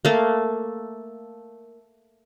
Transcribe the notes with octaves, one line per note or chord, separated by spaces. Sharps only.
A3 A#3